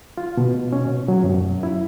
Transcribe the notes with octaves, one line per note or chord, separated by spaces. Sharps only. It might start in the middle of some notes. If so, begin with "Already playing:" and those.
F4
B2
C#4
B2
F#3
F#2
E4